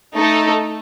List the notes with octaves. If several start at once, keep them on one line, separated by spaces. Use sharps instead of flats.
A3 D#4 A4